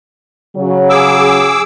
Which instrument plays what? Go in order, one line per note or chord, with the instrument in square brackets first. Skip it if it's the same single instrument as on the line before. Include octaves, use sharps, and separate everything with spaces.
[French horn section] C#3 F#3
[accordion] G#4 D6 E6